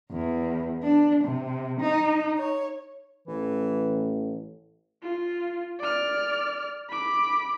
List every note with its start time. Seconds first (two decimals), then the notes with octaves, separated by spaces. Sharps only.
0.11 E2
0.82 D4
1.23 C3
1.80 D#4
2.37 C#5
3.28 A1 E3
5.03 F4
5.80 D5 F6
6.90 B5 D6